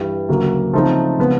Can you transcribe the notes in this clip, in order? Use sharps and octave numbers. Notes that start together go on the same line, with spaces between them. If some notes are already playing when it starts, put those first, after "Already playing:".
Already playing: G2 E3 G3
D2 C#3 F#3 A#3
C#3 F3 A3 C4 D#4
C#3 F3 G#3 B3